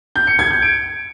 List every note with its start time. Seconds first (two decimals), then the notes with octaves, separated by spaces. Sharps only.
0.16 G6
0.27 C#7
0.39 G#6
0.51 G6
0.62 D7